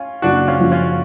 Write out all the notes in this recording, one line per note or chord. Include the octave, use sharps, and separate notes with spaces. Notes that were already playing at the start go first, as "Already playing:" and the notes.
Already playing: C#4 F4
F#1 D4 F#4
C#4 F4
F#2 F3
C#4 F4